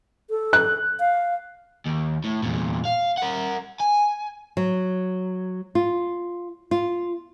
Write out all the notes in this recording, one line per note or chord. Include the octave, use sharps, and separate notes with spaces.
A4
F#6
F5
D#2
A2
E2 A#2
F5
A#4 F#5
G#5
F#3
F4
F4